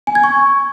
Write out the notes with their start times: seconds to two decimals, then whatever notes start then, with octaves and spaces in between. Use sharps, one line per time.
0.07 G#5
0.15 G#6
0.24 C#6